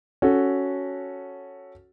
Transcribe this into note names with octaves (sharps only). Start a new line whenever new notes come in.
C#4 F#4 A4